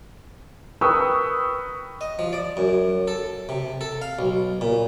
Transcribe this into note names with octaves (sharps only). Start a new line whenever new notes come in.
A#4 B4 G5 C#6 D#6 E6
D#5
F3
D5
F#2
A4
C3
A4
F5
B1
A#2